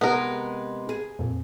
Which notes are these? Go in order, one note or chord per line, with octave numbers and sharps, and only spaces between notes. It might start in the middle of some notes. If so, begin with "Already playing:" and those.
C3 G#3 B3 G4 G#4 A#4
G#4
F2 A#2